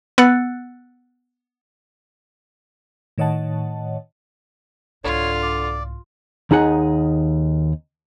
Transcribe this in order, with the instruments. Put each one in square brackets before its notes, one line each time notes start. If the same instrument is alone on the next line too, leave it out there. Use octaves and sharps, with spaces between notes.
[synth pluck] B3 F#5 E6 F#6 A6 C#7
[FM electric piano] A2 D#3 C#5 D#5 F#5 A5
[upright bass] C2 G#2 [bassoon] D3 [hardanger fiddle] F4 [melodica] C#5
[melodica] D5
[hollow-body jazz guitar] D#2 D#4 G#4 F#5